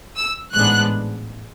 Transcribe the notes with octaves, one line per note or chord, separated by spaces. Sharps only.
E6
A1 G#2 G#3 B3 D4 F#6